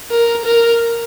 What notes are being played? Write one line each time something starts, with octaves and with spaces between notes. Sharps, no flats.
A#4
A#4